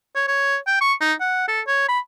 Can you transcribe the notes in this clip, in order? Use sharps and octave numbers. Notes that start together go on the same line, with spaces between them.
C#5
C#5
G5
C#6
D#4
F#5
A4
C#5
B5